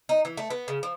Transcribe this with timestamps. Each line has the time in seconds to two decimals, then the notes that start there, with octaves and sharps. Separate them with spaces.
0.09 D#4
0.25 E3
0.37 A3
0.50 B3
0.68 C#3
0.83 F3